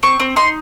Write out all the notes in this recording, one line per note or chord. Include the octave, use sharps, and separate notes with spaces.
C4 C#6
C4
D#4 C6